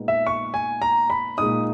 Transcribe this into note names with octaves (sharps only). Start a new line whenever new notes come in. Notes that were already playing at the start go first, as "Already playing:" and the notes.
Already playing: A#2 G#3 B3 D#4
E5
C#6
G#5
A#5
B5
A#2 G#3 D#4 D#6